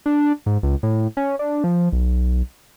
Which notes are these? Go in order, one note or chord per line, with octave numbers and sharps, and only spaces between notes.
D4
G#2
C#2
A2
C#4
D4
F3
B1